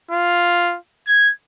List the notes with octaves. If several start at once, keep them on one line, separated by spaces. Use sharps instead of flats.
F4
G#6